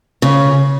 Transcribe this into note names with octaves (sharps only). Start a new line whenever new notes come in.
C#3